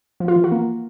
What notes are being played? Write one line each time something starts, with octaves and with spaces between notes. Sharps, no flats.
F3
F4
E3
F#4
A#3